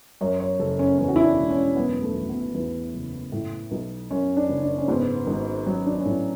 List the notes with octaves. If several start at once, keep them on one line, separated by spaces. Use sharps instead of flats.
F#2 C#5
C#5
F#1 A4
C#4
E2 C#4
F#4
E4
D4
E1
C#4
F#2 B3
A3
G#1
B3
E2
F#1
A2
B1
F#2 C#4
D4
F#1
D4
C#4
G#2 B3
G#1
F#3 C#4
D4
C#4
A2 D4